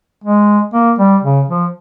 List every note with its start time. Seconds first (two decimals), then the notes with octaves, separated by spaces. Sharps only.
0.24 G#3
0.74 A#3
0.99 G3
1.23 C#3
1.48 F3